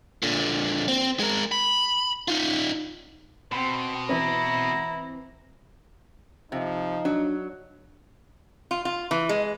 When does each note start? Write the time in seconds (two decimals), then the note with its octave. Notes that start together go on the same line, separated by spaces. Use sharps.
0.23 A#2 D3
0.88 C4
1.20 G#3 A#4
1.52 B5
2.28 D#4 F4
3.52 B2 C4 B5
4.09 E3 C4 E4 A#5
6.52 C3 F3 D#4
7.05 F#3 D4
8.71 F4
8.85 F4
9.11 E3
9.29 G#3